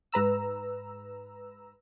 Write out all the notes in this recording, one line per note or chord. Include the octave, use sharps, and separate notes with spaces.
G#2 B4 A#5 E6